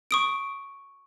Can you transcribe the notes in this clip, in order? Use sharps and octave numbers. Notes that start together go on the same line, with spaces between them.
C#6 D#6 D7